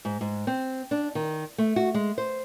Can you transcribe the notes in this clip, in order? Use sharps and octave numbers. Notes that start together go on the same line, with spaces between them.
G#2
G#2
C4
D4
D#3
A3
F#4
G#3
C5